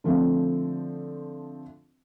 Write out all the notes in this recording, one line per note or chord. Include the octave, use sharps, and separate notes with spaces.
D3 F3 A3 C4